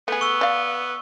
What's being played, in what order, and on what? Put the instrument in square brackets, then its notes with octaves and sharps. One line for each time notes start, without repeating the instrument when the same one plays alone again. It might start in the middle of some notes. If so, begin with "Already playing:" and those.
[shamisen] A3 G#4 [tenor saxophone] B3
[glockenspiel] C#6 E6 G7
[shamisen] D5 F5